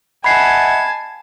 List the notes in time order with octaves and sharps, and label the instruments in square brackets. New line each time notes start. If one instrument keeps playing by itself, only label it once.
[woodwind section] D#5 E5 F#5 [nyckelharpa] G#5 A5 [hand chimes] B5 C7 [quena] G#6